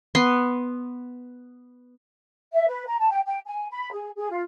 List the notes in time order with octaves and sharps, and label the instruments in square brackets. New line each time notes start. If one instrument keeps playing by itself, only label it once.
[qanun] B3 C6
[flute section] E5
B4
A#5
A5
G5
G5
G#5
B5
G#4
G#4
F4